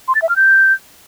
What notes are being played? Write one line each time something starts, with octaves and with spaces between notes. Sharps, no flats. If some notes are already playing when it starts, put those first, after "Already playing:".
C6
A6
E5
F6
G6